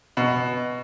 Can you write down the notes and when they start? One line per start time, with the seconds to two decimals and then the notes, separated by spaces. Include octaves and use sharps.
0.17 B2